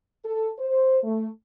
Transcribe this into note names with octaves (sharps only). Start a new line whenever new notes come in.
A4
C5
A3